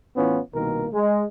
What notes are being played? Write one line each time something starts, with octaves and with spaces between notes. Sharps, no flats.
A2 E3 B3 C#4 F4
C2 B2 D#3 A#3 A#4
G#3